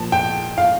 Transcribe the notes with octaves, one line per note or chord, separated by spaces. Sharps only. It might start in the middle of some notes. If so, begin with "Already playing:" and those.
Already playing: A#2 F3 A5
G5
F5